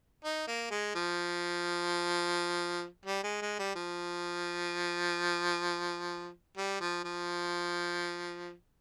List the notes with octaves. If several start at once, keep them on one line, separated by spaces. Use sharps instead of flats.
D#4
A#3
G#3
F3
G3
G#3
G#3
G3
F3
G3
F3
F3